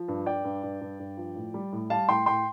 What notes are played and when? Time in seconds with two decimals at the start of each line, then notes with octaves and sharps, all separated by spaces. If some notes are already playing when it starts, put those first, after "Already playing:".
Already playing: F3
0.08 G2
0.26 G2 D5 G5
0.44 G2
0.63 G2
0.81 G2
0.99 G2
1.17 F3
1.36 A2
1.54 G3
1.72 A2
1.90 G3 F5 A5
2.09 A2 G5 C6
2.26 A2 G5 C6